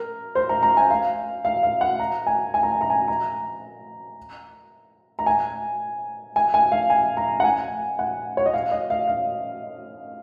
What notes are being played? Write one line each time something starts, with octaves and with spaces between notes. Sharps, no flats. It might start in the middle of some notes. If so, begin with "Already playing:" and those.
Already playing: A#4
C5
A#5
A#5
G#5
F5
F5
F5
F#5
A#5
G#5
G#5
A#5
G#5
A#5
G#5
A#5
A#5
G#5
G#5
G#5
F5
G#5
A#5
F#5
G#5
F#5
C#5
D#5
F5
D#5
F5
F5